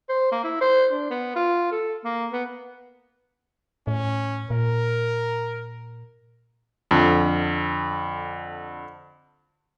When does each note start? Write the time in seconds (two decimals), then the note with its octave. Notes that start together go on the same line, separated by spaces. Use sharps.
0.09 C5
0.32 A#3
0.44 E4
0.61 C5
0.91 D4
1.10 B3
1.36 F4
1.71 A4
2.04 A#3
2.33 B3
3.87 A2 C#4
4.50 A#2 A#4
6.91 F2 D3